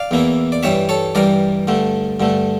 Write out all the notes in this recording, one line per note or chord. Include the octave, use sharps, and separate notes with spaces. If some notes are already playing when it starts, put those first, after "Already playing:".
Already playing: D5 F5
E2 E3 A#3 E4
D5
G2 E3 G3 C#5 E5
A4 C#5
G2 E3 G3 A#4 D5
G2 D3 A3
G2 D3 A3